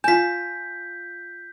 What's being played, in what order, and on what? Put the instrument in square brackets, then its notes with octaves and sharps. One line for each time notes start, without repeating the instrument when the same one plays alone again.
[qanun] F4 A5 [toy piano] G#5 [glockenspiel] G6 B6